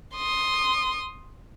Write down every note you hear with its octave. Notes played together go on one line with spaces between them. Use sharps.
C6 D#6